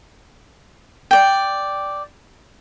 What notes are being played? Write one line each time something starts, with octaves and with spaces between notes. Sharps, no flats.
D5 G5